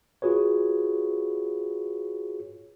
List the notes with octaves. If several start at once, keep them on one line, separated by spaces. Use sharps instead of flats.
F4 F#4 G#4 B4 C#5